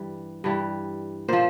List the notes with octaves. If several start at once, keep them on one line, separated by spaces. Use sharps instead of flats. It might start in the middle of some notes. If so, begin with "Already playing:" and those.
Already playing: G2 E3 G3
G2 E3 G3
A#2 F3 C5